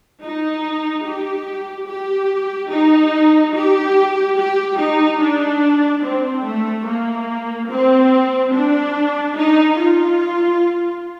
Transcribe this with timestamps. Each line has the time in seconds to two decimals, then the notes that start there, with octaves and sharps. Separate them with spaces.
0.22 D#4
1.04 G4
1.88 G4
2.71 D#4
3.55 G4
4.38 G4
4.79 D#4
5.21 D4
6.05 C4
6.45 A3
6.87 A#3
7.71 C4
8.54 D4
9.37 D#4
9.78 F4